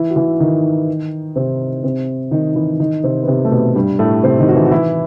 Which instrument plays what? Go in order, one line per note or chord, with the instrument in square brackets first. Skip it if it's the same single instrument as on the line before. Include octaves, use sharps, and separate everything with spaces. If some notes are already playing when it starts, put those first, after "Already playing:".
Already playing: [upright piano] E3 E4
F#4
E3 E4
D#3 D#4
C3 C4
C3 C4
D#3 D#4
E3 E4
D#3 D#4
C3 C4
B3
C3 C4
A3
B2 B3
G2 G3
A2 A3
C3 C4
D#3 D#4
F#4
E3 E4
F#4
E3 E4